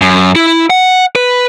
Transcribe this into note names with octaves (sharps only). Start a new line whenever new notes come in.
F#2
E4
F#5
B4